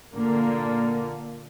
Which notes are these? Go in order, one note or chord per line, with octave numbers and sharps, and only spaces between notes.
A#2 D3 A#3